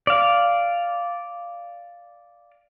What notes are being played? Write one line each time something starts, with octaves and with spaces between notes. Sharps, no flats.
D5 F5